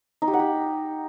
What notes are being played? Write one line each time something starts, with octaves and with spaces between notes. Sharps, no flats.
D#4
G4
F#5
G4